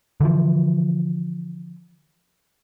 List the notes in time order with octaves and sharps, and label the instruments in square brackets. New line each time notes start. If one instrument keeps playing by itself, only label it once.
[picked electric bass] D3 E3 F3